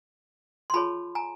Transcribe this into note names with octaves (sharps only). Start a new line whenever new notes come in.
C6
F4 G#4 C#5 A5 B5
G#5 A#5